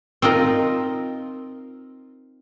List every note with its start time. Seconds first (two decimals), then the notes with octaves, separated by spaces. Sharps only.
0.22 C4 D#4 F4 A#4